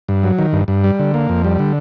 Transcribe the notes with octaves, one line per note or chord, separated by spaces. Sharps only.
G2
F#3
D#3
G2
G2
G3
D3
A#3
F2
G3
D3